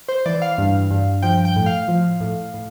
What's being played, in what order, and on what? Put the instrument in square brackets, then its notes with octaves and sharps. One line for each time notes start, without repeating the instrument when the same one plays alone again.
[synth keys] C5
E3 D5
F5
G2
G2
F3 G5
G5
A2
F5
F3
A2
A2